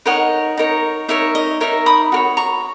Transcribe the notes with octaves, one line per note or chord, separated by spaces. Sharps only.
D#4 A#4 C#5 D#5 F#5
D#4 A#4 C#5
D#4 A#4 C#5 E5
D#5
D#4 A#4 C#5 E5
B5 D#6
F#4 A#4 C#5
A#5 C#6